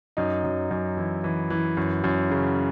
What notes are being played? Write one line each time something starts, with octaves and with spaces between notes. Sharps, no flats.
F#2 D#4
F#2
F#2
E3 E4
E3
E3
F#2
F#2
C#3